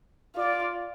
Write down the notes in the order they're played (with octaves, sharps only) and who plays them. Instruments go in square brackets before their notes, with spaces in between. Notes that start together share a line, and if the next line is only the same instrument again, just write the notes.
[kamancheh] F4 [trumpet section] D5